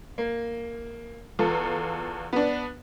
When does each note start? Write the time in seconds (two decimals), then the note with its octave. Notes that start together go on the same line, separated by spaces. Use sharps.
0.18 A#3
1.39 E2 F4 A4
2.33 B3 D4